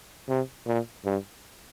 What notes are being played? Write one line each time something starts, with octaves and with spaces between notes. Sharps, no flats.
C3
A#2
G2